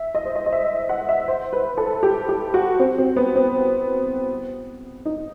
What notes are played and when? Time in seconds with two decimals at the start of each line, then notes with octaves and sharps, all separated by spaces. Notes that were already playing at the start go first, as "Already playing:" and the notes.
Already playing: E5
0.15 D#5
0.25 C5
0.35 D#5
0.46 D#5
0.52 E5
0.89 F#5
1.09 E5
1.28 C5
1.53 B4
1.78 A4
2.03 G4
2.29 G4
2.54 F#4
2.80 C4
2.98 C4
3.16 B3
3.35 C4
5.05 D#4